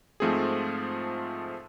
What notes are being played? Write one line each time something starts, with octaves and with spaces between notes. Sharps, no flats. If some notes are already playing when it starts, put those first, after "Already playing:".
G#2 F3 A3 C4 G#4